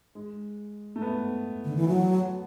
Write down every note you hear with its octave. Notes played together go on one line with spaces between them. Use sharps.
G#3
A3
B3
D3
E3
F#3